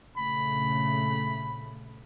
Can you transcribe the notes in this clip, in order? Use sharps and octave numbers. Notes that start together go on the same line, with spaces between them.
A#1 C#3 A3 B5